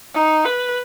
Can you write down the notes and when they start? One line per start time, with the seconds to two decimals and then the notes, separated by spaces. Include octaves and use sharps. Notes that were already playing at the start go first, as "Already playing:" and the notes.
0.15 D#4
0.45 B4